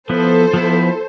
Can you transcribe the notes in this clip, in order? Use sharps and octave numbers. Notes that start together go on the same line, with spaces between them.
F3 B3 E4 A4 C5
F3 B3 E4